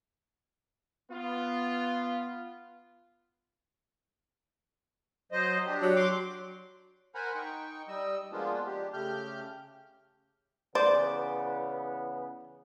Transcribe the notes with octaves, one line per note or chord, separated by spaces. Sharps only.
B3 F4
F#3 C5 D#5
D4 G4
F#3
C6 D6
A#4 C5 F#5 G#5 A#5 B5
D#4 G5 C#6
G3 D#5 E6
F3 G#3 A#3 B3 D4 F4
D4 G4
C#3 A3 G4 F6 G6
C#3 E3 B3 C5 D5